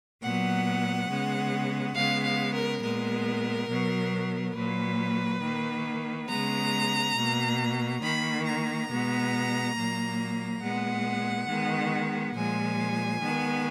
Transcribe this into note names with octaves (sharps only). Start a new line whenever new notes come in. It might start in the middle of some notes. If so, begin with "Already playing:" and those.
A#2 F#3 B3 F#5
C#3 G#3 B3
C#3 G#3 B3 F5
F5
A#4
A#2 G#3 B3 A#4
B2 F#3 B3
A#2 F#3 A#3 B4
D#3 A#3
C#3 G#3 B3 A#5
B2 A#3
D#3 A#3 B5
A#5
B2 G#3 B3
A#2 F#3 A#3
A#2 G#3 B3 F#5
D#3 G#3 B3
A#2 F3 G#3 G#5
D#3 G#3 B3